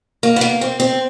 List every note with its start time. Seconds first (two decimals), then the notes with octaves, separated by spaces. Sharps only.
0.23 A#3
0.36 B3
0.41 A#3
0.61 C4
0.80 C4